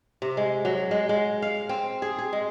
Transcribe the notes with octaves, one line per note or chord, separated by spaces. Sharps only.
C3
G#3
F#3
G#3
G#3
F5
C4
G#4
G#4
G#3